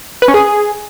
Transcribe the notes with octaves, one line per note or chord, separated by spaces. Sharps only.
B4
C#4
G#4